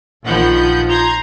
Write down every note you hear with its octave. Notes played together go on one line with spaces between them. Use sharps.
A#1 D#3 F3 F#5 B5 G6
A#5 C6 G6 G#6